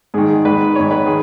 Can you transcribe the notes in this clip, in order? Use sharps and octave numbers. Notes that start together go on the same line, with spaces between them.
G#2 D#3 G#4
G#4
G#2 D#3 B4
G#2 D#3 C#5
B4
D#3 G#4